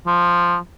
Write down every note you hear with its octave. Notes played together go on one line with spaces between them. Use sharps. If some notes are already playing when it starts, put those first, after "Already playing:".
F3